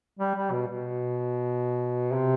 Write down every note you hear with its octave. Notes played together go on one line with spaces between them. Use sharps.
G3
G3
B2
B2
C3